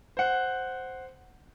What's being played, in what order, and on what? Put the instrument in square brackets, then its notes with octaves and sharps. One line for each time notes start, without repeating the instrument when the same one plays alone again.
[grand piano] C5 F#5